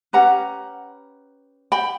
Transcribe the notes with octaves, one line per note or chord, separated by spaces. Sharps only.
C#4 G4 B4 F#5 A#5
G5 B5